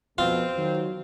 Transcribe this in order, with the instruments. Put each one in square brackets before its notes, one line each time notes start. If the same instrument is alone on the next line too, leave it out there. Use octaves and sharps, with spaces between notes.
[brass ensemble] F2 B2 [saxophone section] C4 [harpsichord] F4
[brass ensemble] D#3 F#3